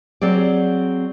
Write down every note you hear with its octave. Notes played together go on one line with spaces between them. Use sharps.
F#3 C4 G#4 D5